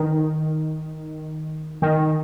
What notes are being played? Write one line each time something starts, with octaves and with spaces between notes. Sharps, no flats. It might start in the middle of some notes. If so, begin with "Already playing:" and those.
Already playing: D#3
D#3